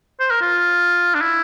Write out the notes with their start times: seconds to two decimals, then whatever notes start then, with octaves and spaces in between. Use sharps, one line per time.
0.20 C5
0.31 A#4
0.41 F4
1.15 D4
1.22 E4